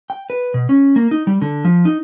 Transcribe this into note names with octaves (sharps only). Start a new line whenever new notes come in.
G5
B4
B2
C#4
A#3
D#4
G3
D3
F3
D#4